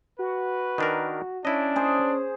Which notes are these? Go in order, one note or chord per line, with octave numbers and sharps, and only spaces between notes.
F#4 B4
D#3 D4 A#4
C#4 D4 E4 D#5
G#4 C5